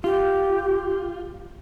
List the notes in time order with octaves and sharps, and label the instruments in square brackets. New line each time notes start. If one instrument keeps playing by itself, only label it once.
[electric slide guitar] F4 [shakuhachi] G4